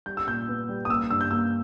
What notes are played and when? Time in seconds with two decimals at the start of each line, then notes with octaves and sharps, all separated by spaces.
0.06 G3 G6
0.17 E6
0.27 A#2 G6
0.48 B3
0.69 G3
0.85 D#6
0.89 A#3 E6
1.10 G2 E6
1.21 G6
1.31 A#3 E6